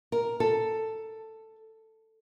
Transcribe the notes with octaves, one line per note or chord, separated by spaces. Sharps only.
A#4
A4